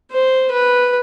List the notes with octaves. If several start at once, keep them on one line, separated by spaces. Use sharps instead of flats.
C5
B4